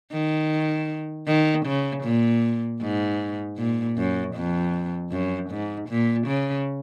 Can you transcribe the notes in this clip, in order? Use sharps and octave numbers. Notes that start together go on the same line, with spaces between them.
D#3
D#3
C#3
A#2
G#2
A#2
F#2
F2
F#2
G#2
A#2
C#3